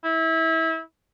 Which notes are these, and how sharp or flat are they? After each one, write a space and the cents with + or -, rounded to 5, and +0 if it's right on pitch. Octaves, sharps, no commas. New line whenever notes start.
E4 -25